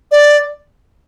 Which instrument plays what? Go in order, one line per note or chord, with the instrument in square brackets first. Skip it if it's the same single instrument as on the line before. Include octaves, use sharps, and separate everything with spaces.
[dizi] D5